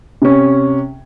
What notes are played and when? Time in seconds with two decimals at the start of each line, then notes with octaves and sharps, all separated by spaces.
0.22 C3 C#4